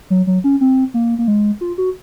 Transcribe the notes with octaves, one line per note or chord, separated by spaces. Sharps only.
F#3
F#3
C#4
C4
A#3
A#3
G#3
F4
F#4